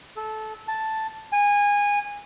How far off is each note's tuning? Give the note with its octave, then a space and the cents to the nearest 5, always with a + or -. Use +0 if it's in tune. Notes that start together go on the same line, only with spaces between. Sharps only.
A4 -20
A5 +0
G#5 -20